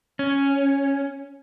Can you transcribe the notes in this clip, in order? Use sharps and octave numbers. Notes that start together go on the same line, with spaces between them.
C#4